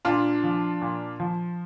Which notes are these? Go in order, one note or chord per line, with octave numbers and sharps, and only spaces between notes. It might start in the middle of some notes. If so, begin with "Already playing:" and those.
A#2 D4 F4
F3
A#2
F3